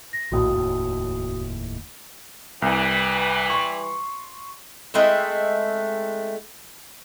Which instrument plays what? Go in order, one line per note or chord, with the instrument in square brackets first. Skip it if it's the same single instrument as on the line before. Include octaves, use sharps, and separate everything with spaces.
[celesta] A#6
[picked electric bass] A#1 D#2 A2 [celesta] F#4 D#6
[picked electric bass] F1 D#2 A2
[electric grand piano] C2 [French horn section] E3 G3 B4
[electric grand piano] C6 C#6
[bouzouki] G#3 A3 C4 E4